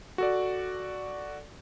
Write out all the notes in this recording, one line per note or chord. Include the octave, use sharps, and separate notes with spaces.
F#4 A4 D5